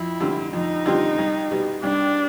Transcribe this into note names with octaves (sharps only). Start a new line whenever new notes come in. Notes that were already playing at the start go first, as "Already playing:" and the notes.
Already playing: F2 E4
D3 G3 C4 F4
F2 D#4
D3 G3 C4 F4
C2
B2 G3
C2 D4